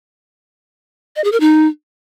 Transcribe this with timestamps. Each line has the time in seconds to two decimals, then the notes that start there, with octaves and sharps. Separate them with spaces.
1.16 D#5
1.24 G#4
1.32 A#4
1.40 D#4